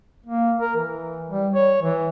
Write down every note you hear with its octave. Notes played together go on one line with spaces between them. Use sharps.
A#3
A#4
E3
G3
C#5
E3